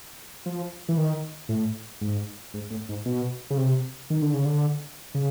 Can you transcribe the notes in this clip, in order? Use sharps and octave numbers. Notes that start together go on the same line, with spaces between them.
F3
E3
D#3
A2
G#2
G#2
A2
G#2
B2
C#3
C3
D#3
D3
C#3
D3
C#3